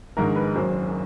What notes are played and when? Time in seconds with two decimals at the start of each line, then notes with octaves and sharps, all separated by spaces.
0.17 A#1 G#2 D#3 G#3 A#4
0.36 B4
0.55 F#1 F#2 D#3 C5